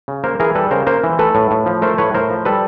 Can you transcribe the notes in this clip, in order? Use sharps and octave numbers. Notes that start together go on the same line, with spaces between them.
C#3
A#3 A#4 C5
E3 G#4 A#4
G3 A4 B4
C#3 A#4 C5
A#3 A#4 C5
E3
A3 A4 B4
A2
A2
F3
A3 A#4 C5
A2 B4 C#5
A2 A#4 C5
F3
G3 A4 B4